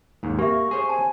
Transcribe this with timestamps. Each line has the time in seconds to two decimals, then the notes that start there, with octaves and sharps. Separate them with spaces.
0.23 D#2 G#2
0.39 A#3 G4 E5 C#6
0.71 G#4 C5 C#5
0.89 G#5 A5